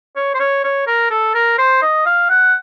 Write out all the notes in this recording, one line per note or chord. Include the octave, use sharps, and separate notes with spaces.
C#5
C5
C#5
C#5
A#4
A4
A#4
C5
D#5
F5
F#5